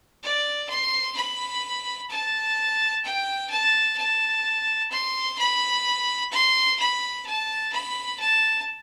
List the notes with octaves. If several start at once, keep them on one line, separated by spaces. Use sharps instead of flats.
D5
C6
B5
A5
G5
A5
A5
C6
B5
C6
B5
A5
B5
A5